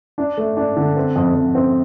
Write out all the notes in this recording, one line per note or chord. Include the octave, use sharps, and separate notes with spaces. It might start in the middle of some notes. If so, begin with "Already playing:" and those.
D4
A3
D4
D3
C4
F2
F2
C4